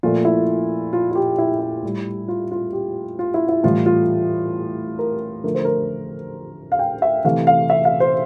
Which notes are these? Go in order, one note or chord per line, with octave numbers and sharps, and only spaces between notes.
A#2 F3 A3 F4
E4
F4
F4
G4
E4
E4
A2 G3
F4
F4
G4
F4
E4
E4
A2 E3 G3 F4
F4
A#4
D3 F3 A3 A#4
C5
A#4
F5
G5
E5
C3 E3 A3 F5
F5
E5
F5
C5